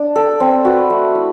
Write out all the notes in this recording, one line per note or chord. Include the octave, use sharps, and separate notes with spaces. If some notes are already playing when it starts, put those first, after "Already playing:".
Already playing: D4
A4 D5
C4
F#4 B4
A3
E4